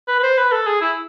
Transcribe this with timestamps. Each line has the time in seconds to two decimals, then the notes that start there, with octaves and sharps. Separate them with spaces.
0.08 B4
0.19 B4
0.23 C5
0.37 B4
0.52 A4
0.66 G#4
0.81 E4